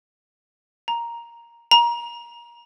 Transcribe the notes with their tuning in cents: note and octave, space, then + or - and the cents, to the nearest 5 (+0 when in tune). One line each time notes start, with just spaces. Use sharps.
A#5 +5
A#5 +25